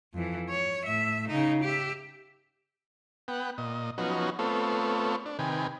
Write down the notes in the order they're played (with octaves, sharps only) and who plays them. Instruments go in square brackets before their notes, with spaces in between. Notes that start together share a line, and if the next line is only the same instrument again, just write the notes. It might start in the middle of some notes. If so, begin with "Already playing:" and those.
[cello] F2 E3
C#5
A2 E5
C#3 D#4
G4 E5
[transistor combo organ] B3 F#5 G5
A#2 D#5
F3 F#3 B3 C#4 D#4 F#4
A3 B3 C4 F4 A4 C#5
D4
C3 D#3 B4 G5 G#5